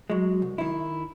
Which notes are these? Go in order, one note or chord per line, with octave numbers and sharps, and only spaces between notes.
F#3 G#3
C2
D#3 E4